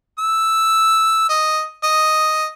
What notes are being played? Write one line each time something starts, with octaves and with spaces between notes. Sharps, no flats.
E6
D#5
D#5